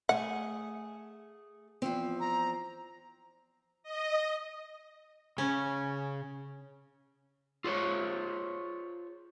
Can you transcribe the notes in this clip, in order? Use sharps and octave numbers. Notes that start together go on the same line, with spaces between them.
A3 G#4 F#5
E2 F3 C4
A#5
D#5
C#3 C#4
F4 G#4 C5 C#5